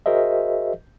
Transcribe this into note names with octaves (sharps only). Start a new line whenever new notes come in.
F#4 G#4 A#4 C5 D#5 E5